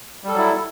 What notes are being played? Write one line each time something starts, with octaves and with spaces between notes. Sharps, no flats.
F#3 G3 E4 A4